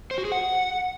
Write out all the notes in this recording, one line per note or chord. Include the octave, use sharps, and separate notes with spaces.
C5
F#4
G#4
F#5